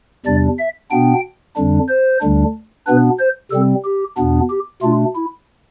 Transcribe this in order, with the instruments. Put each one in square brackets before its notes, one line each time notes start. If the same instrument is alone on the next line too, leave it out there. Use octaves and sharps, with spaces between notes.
[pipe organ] E2 C3 G3 D4 D5
E5
B2 B3 D4 G5
F2 D3 G3 D4
C5
D2 D3 G3 D4
B2 B3 D4 B4
C5
C3 G3 C4 A4
G4
E2 B2 B3 D4
G4
B2 A3 D4 F4
E4